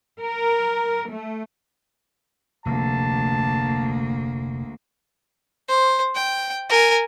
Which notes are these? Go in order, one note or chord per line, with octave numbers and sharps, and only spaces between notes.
A#4
A3
F1 D2 A#3 A5
C5
G5
A#4 G#5